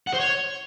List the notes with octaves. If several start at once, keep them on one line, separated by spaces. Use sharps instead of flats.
F#5
C5
C#5